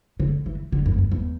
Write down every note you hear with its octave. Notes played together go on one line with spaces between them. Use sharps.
D3
E3
D3
F#2
F#2
E2